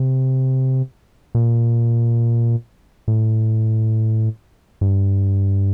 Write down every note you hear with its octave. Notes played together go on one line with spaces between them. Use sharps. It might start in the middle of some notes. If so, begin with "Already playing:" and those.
Already playing: C3
A#2
A2
G2